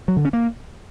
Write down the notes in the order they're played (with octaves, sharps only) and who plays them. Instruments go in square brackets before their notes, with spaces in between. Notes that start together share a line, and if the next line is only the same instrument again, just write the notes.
[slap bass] F#3
D3
C#4
A#3